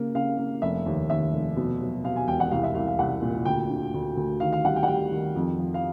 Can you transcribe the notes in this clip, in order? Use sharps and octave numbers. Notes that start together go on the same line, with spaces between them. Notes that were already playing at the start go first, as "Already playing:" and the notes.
Already playing: C#3 A#3
C#3 F5
A#3
F1 E5
D#2
D#2 E5
F1
B2
F#3
B2 F5
G#5
E1 G5
F#5
C2 F5
E5
C2 F5
F5
C2 F#5
A#2
D2 G5
D3
D2
D2
D#3 F5
F5
G3 F#5
G5
F#5
G3 G5
D#3
F2
F3
F5